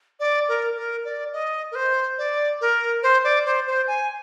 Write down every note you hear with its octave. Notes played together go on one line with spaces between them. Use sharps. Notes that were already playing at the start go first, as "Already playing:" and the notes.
D5
A#4
A#4
D5
D#5
A#4
C5
D5
A#4
C5
D5
C5
C5
G#5